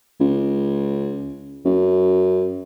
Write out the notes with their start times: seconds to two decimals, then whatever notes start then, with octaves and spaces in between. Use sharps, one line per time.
0.20 C#2
1.65 F#2